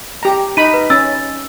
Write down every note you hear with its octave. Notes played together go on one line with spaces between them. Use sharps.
G4 A#5
D#4 B5 D#7
B4
C#4 E6 A6